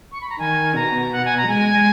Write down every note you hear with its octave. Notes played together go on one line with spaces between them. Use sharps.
C#6
B5
A#5
D#3 G#5
B2 A#5
F#5
G#5
A#5
G#3 G#5